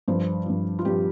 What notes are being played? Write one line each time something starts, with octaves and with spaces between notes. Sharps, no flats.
G2 F3 C5
G2 F3
F4
G2 F3 G4